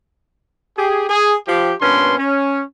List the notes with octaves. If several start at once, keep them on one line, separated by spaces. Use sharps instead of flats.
G4 G#4
G#4
F3 G4
G2 A#2 B3 C#4 D4 C6
C#4